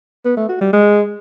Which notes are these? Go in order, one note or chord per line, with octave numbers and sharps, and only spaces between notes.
B3
A3
F#4
G3
G#3